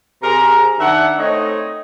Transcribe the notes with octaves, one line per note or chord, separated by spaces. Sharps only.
C3 G#4 A#4 A#5
D#3 D4 E5 F#5
A3 C4 D#4 C#5 D#5